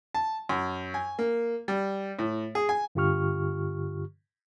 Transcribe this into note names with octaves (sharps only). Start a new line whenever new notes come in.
A5
F#2
G#5
A#3
G3
A2
G#4
G#5
G2 D3 F4 G4 C#6 F6